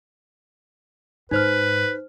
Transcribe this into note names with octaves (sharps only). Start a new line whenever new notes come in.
G#2 D#4 B4 C5 F6